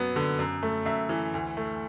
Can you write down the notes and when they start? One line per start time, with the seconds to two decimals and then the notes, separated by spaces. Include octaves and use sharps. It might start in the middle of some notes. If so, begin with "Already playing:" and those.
Already playing: F#2 F#3 B3
0.16 D3
0.39 F#2
0.63 A3
0.86 F#2 E5
1.09 E3
1.34 D2
1.57 A3